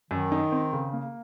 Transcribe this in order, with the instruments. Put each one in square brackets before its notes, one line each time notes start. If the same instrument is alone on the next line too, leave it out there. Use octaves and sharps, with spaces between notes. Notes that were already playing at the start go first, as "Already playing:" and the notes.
[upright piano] F#2 [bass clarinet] D#3
[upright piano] D#4
C4
C#3
A#3